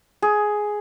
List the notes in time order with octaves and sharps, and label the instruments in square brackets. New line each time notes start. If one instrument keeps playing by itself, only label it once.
[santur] G#4